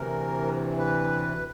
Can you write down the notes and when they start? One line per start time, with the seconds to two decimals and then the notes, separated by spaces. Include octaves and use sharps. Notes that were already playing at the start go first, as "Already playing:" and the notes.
Already playing: D2 C3 E3 A#4
0.79 B4